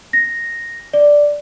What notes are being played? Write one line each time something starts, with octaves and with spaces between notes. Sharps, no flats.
A#6
D5